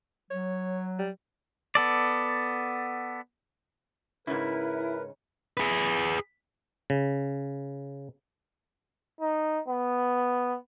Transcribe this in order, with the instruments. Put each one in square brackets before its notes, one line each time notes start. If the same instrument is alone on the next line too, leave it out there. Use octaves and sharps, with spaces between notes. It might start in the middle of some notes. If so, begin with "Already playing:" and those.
[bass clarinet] F#3 [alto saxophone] C#5
[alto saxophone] G3
[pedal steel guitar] B3 A4 D5
[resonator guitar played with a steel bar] G#2 C#3 C#4 [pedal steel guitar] E4 [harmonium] A#4 B4
[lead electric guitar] G#4 B4
[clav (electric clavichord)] C#3
[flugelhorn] D#4
B3